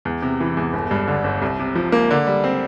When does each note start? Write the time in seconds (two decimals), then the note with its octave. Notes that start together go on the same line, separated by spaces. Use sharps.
0.05 E2
0.22 C3
0.40 E3
0.57 E2
0.73 G1
0.91 G2
1.07 D3
1.24 G1
1.42 C2
1.59 C3
1.75 F3
1.92 A#3
2.11 D3
2.27 G3
2.44 C4